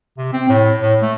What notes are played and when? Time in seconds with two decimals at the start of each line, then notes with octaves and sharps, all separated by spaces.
0.18 C3
0.33 C4
0.49 A2
0.82 A2
1.02 A3